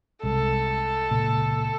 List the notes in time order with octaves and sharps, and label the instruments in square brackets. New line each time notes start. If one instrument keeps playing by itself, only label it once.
[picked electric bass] C2 G#3 [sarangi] A4
[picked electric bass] C#2 A#2